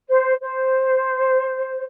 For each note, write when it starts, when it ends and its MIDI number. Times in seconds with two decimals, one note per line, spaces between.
0.07 0.33 72
0.39 1.82 72